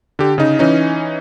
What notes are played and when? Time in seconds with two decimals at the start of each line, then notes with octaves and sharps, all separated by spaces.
0.19 D3 G4
0.38 C#3 D#4
0.59 E3 C#4 D#4